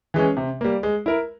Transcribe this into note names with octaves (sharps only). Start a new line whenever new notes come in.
E3 G#3 C#4
C3
G3 A#3
G#3
E4 A#4